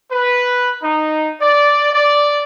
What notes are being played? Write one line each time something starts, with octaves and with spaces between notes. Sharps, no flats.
B4
D#4
D5
D5